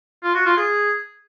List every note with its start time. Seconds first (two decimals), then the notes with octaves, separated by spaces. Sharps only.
0.23 F4
0.35 F#4
0.46 F4
0.57 G#4